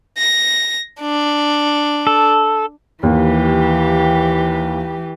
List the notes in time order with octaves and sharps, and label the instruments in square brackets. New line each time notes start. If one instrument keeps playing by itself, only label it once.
[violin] A#6
D4
[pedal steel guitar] A4
[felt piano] D#2 [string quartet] E3 G4